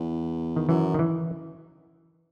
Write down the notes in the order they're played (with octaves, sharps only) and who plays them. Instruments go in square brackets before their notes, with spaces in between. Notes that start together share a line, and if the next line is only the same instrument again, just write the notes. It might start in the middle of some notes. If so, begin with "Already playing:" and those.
Already playing: [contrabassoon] E2
[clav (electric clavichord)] D#3
[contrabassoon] F#2 [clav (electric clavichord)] E3
[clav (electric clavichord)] D#3
E3